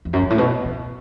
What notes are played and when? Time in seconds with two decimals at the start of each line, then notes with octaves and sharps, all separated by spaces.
0.05 E2
0.13 F#2
0.22 G2
0.30 A2
0.38 B2
0.65 C#3